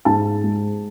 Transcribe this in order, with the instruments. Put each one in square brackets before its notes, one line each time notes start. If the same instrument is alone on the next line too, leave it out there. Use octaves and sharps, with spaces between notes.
[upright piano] G#2 A5
G#3